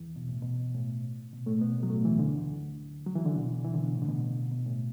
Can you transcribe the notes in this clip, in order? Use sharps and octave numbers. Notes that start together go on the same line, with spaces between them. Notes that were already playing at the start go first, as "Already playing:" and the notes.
Already playing: E2 E3
B2
A2
B2
A2
B2
A2 A3
B2 B3
F#3
A2 A3
E2 E3
D2 D3
F#3
E3
D3
B2
E3
D3
B2
A2
D3
B2
B2
A2